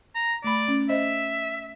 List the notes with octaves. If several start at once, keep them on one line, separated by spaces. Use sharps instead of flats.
A#5
A3 D5 B5
C#4
C5 D#5 E5